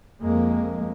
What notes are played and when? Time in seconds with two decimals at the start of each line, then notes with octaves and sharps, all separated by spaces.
0.21 F2 G#3 A#3